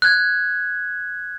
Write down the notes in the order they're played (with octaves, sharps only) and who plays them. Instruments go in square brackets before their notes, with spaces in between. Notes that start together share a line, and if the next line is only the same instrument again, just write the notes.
[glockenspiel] F#6 G#6